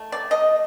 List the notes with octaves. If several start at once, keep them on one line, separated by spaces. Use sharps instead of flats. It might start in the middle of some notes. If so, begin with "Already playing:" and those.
Already playing: D#3 A3
D5
D#5